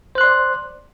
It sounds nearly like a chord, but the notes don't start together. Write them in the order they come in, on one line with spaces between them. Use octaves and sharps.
C5 F#6 C6 D5